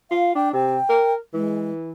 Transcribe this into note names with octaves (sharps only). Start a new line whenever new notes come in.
F4 F5
D4 G5
C3 G5
A#4
E3 G#3